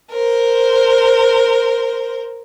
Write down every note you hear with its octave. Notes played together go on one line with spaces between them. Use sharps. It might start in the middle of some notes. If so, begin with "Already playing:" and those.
A#4 C5